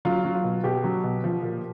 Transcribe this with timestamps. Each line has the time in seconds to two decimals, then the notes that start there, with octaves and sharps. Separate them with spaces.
0.05 F#3 F4
0.25 F#3
0.34 F4
0.44 B2
0.64 B2 G4
0.84 F#3
1.04 B2
1.24 F3
1.43 A#2